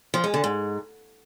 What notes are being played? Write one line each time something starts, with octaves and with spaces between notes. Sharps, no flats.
F3
G#3
D3
G#2